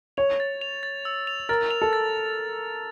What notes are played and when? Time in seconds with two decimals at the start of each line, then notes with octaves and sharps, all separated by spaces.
0.17 C#5 F7
0.40 A6
0.61 F7
0.83 A6
1.05 E6
1.27 F7
1.49 A#4 A6
1.71 F7
1.82 A4
1.93 A6